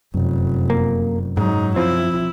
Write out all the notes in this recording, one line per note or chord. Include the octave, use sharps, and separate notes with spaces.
F1 F#2
A#3
G#2 F#3 D#4
F3 C4 E4